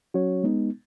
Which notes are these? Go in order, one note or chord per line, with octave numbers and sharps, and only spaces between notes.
F#3 C#4 F#4 C#5
G#3 B3 D#4